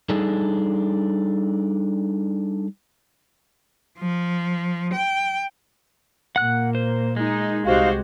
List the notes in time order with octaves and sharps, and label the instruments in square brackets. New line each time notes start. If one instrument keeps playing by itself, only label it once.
[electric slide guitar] G3 D4 D#4 G#4 A4
[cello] F3
G5
[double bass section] A#2 A#3 [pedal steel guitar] F#5 F#6
[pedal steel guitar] C5
[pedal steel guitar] G#3 [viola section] D#4
[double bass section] C2 [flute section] D#4 F5 [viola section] F#4 G4 C5